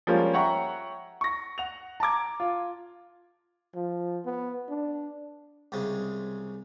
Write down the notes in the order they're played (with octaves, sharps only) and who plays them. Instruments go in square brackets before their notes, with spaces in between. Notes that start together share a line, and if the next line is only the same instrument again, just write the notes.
[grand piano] F3 G3 G#3 A#3 C#4 F4
C#5 E5 F#5 G5 A#5 C#6
C#6 A#6
F#5 F7
A5 A#5 D6 G#6
F4
[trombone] F3
B3
D4
[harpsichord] C2 G#2 C#3 G#3